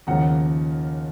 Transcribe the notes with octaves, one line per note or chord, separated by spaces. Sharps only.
D#2 C#3 F3 F#5 A#5